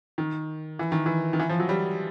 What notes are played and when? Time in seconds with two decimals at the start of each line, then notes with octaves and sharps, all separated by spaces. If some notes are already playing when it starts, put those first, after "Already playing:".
0.18 D#3
0.79 E3
0.92 D#3
1.06 E3
1.33 D#3
1.39 E3
1.49 F3
1.59 F#3
1.69 G3